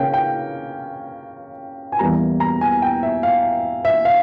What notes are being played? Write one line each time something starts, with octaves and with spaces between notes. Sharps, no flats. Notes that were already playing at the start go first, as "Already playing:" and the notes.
Already playing: C#3 A#3 C#4 G5
G5
G#5
E2 E3 G3 A#3 A#5
A#5
G#5
G5
E5
F5
E5
F5